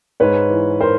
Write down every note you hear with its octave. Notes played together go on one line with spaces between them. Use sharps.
G#2 B4 C#5
E3
A#4 C5